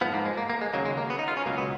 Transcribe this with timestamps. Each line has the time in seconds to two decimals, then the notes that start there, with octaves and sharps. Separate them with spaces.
0.01 G#2 F3 B3
0.13 A#3
0.25 G#3
0.37 A#3
0.50 A#3
0.61 G#3
0.74 D#2 C#3 F#3 A#3
0.85 G#3
0.97 A#3
1.10 B3
1.19 D#4
1.28 F4
1.37 C#4
1.46 C#2 B2 F#3 A#3
1.58 B3